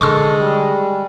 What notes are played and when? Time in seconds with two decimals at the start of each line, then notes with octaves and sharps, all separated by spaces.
0.01 D3 D#3 G#3 A4 C6 C#6 E6
0.40 G3